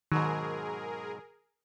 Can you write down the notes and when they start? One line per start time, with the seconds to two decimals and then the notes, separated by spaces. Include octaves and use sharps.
0.12 G#2 B2 D#3 F#3 G#4 A#4